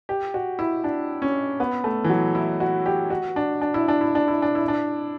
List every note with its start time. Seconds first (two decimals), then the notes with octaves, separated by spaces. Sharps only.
0.09 G4
0.34 F#4
0.59 E4
0.84 D4
1.22 C#4
1.60 B3
1.84 A3
2.04 E3
2.09 F#3
2.35 E4
2.60 F#4
2.86 G4
3.10 F#4
3.36 D4
3.61 D4
3.74 E4
3.88 D4
4.01 E4
4.15 D4
4.28 E4
4.42 D4
4.55 E4
4.68 D4